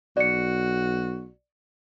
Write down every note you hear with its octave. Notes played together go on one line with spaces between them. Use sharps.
B1 F#4 D5 C#7